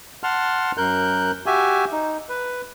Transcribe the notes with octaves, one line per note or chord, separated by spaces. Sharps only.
F#5 A5 C6 F6
F#2 A#4 F#6 G6
F#4 G4 E5 G#5
D#4
B4